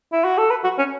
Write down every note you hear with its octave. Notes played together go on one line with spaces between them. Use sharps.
E4
F#4
A4
B4
F#4
C#4